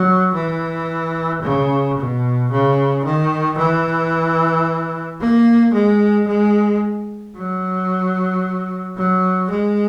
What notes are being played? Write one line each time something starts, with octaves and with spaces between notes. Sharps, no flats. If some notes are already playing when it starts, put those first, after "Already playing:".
Already playing: F#3
E3
C#3
B2
C#3
D#3
E3
A#3
G#3
G#3
F#3
F#3
G#3